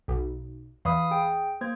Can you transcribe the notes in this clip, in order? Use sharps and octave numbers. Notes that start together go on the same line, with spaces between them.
B1
E2 F5 B5 D#6
G#4 G5
A#3 C5 G#6